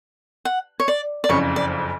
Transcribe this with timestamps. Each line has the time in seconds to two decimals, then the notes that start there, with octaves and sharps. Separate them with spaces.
0.45 F#5
0.80 C#5
0.88 D5
1.24 D5
1.29 F#1 F2 C#3 C#5
1.56 D5